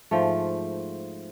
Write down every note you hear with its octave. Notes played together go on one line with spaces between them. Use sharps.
G#2 F3 A3